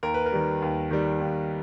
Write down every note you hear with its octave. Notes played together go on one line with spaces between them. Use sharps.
D#2 A#4
B4
A#4
D#3 G3
D#2
D#3 G3
D#2